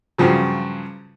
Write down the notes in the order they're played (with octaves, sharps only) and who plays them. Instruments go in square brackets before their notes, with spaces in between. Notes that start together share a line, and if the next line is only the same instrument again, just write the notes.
[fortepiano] G2 C#3 F3 F#3